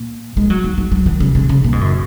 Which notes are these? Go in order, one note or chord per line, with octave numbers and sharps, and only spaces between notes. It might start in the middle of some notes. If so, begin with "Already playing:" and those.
Already playing: A#2
G#3
F#3
D#3
F#3
F#3
D#3
C#3
C#3
C#3
A#2
G#2
F#2